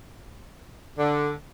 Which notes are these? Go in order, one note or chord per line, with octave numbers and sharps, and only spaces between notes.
D3